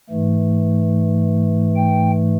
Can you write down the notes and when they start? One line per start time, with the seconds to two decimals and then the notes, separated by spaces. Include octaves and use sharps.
0.10 G#2 E3 A3
1.76 G5